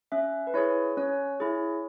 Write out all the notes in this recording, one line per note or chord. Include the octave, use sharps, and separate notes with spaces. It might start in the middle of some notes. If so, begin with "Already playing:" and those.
C#4 E5
B4
E4 G#4 C#5
C#4 C#5
E4 G#4